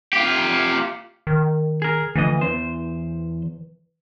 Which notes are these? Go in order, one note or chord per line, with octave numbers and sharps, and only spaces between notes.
F4 G4
D#3
G#4 A#4
D2 E3 F3 D#5
E2 C5